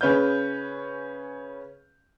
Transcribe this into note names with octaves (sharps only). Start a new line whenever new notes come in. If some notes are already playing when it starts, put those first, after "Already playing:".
C#3 C#4 B4 F6 G6